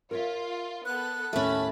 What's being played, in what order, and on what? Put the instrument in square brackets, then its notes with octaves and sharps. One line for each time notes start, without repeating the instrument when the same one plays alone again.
[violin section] F4 [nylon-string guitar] A#4 C#5 E5
[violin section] B3 A4 [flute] F#6
[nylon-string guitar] D#2 A2 [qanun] A3 C#4 [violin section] A5 B5